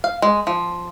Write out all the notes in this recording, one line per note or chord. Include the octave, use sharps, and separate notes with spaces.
F5
G#3
F3